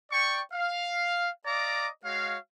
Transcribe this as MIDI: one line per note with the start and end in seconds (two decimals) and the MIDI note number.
0.12 0.40 74
0.12 0.40 79
0.12 0.40 85
0.52 1.29 77
1.46 1.88 74
1.46 1.88 75
1.46 1.88 77
1.46 1.88 82
1.46 1.88 86
2.04 2.36 56
2.04 2.36 66
2.04 2.36 73
2.04 2.36 77